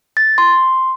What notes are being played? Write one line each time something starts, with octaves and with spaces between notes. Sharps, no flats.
A6
C6